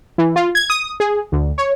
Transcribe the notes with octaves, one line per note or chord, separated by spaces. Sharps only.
E3
F4
G#6
D#6
G#4
D2
C#5